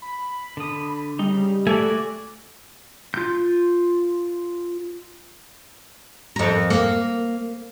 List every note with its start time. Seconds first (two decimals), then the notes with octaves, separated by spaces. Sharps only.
0.02 B5
0.57 D3 D#6
1.19 C#3 G3 D#4
1.67 A3 F#4 D5 G#5
3.14 F4 G6
6.36 F2 A#4
6.70 A#3